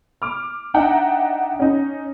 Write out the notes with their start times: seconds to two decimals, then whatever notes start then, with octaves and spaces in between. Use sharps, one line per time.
0.22 D6 F6
0.74 D4 D#4 E5 F#5 G5 A#5
1.59 C#4 D#4